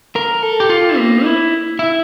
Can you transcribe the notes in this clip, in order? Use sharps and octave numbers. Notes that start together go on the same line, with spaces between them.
A#4
A4
G4
F4
A#3
E4
E4